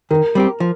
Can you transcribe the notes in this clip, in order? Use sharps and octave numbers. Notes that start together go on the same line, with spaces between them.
D#3 A#4
G3 C4 G4
F3